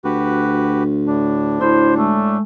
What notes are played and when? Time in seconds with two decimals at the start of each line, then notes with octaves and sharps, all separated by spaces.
0.05 D2 F#4 G4 B4
1.07 A2 D4
1.61 D2 E4 C5 B5
1.96 G#3 A3